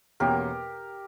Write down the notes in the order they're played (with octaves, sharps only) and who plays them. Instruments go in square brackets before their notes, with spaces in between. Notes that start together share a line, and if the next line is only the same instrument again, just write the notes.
[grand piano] E2 B2 A#3 C#4 [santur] G4 A#4